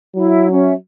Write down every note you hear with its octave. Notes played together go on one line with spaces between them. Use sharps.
F#3 E4
C#4 E5